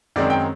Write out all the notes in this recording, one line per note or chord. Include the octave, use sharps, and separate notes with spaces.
F#2 D#3 G#3 C4 D5
G5